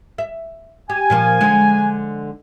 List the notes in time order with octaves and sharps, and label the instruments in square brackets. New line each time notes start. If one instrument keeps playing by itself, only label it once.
[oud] E5
[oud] G4 [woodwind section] G#5
[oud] A#2 F3 A#3
D3 G#3